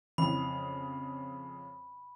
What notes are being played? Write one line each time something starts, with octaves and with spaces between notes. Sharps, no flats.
F2 C#3 E3 B5